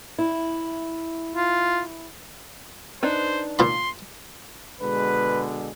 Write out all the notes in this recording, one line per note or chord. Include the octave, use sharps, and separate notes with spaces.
E4
F4
D4 D#4 B4 C5
A#2 F4 B5 C6
B2 D3 G#3 B4